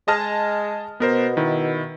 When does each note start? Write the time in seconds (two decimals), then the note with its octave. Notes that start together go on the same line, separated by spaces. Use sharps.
0.08 G#3 D#5 A5 F6
1.00 B2 B3 A#4 C5
1.37 D#3 E4